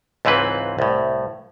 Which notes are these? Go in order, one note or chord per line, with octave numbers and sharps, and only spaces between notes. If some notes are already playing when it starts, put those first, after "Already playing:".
C#2 G#2 E3 C4 B4
C2 A2